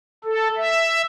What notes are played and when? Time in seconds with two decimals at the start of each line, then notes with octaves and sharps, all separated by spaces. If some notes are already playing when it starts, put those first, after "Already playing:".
0.24 A4
0.57 E5